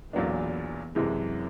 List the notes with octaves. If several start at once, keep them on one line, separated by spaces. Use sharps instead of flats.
B1 E2 A#2 F#3 B3 D4
C2 F#2 C3 E3 G#3